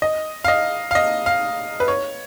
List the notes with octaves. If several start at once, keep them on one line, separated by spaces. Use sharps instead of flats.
D#5
F5
D#5
F5
D#5
F5
B4
C#5